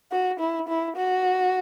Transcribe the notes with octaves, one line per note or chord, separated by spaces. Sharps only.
F#4
E4
E4
F#4